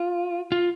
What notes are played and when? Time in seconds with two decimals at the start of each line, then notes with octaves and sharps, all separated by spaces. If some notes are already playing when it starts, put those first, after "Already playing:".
Already playing: F4
0.52 F4